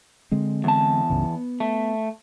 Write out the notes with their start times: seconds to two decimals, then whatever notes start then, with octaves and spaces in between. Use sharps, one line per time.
0.31 D3 G#3 C4
0.64 E2 A5
1.10 C#2 G2 C#3
1.24 B3
1.60 A3